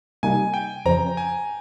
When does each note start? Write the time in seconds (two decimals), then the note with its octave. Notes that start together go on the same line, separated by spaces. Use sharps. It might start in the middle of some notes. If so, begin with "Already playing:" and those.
0.23 C3 G3 A#3 D#4 G#5
0.54 G5
0.85 F2 C#3 F3 C4 A#5
1.17 G#5